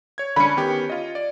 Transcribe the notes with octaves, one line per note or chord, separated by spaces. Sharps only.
C#5 G#6
D3 C#4 B5 C#7
D#3 B3 G4
F4 D#5
D5